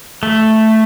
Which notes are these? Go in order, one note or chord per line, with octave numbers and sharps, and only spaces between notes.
A3